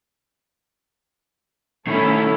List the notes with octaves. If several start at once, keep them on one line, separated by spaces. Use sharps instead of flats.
D#3 A3 C#4 E4 A4